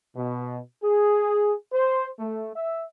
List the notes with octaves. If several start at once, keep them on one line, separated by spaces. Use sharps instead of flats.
B2
G#4
C5
A3
E5